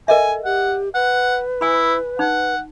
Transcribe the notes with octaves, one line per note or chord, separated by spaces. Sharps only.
A4 A#4 D#5 E5 G#5
G4 F#5
B4 F#5
E4 G#5 B5
D#4 F#5